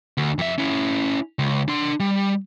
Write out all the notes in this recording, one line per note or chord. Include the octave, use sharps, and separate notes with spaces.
D2
F2 E5
C#4 E4
C#2
D4 C6
G3